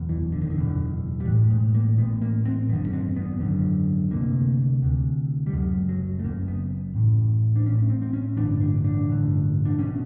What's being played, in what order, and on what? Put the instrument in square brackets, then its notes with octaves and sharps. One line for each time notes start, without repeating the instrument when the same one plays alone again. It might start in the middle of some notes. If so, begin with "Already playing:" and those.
Already playing: [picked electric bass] F#1 E2 B2
E3
D3
D#3
D3
F#1 E2 B2
G3
A1 A2 G#3
G#3
A#3
A1 B3
A2
A#3
C4
G#1 F#2 D3 B3
C#4
C4
B3
G#1 F#2 D3
D2 C3 A#3
D2 C3
G3
F#1 F#2 C#3 G#3
F#3
A3
F#1 F#2 C#3 A#3
B3
A1 A2
D4
A1 C#4
A2
C4
C4
C#4
A1 G2 D3 D4
D4
D4
A1 G2 D3
D4
B2 C#4